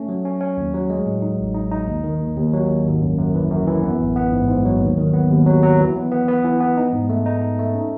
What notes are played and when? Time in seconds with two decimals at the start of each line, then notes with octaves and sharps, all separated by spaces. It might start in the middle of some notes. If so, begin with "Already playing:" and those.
Already playing: A3 C#4
0.09 F#3
0.25 C#4
0.41 C#4
0.57 D#2
0.74 F#3
0.90 G#3
1.06 A2
1.22 D#4
1.39 A1
1.54 D#4
1.71 D#4
1.87 D#2
2.04 D#3
2.20 D#2
2.37 D#2
2.53 F#3
2.69 D#2
2.85 G#1
3.02 F#2
3.18 F#2
3.35 E3
3.50 F#2
3.67 E3
3.83 B3
4.00 A1
4.16 B3
4.32 G#2
4.49 G#2
4.65 F#3
4.80 D#2
4.97 D#3
5.13 B3
5.30 D#2
5.46 F#3
5.63 F#3
5.80 E3
5.96 B3
6.11 B3
6.28 B3
6.44 E3
6.60 B3
6.77 D#4
6.93 G#2
7.09 A3
7.26 D#4
7.42 D#4
7.59 A3
7.75 C#4